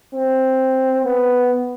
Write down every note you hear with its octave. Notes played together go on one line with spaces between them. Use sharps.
C4
B3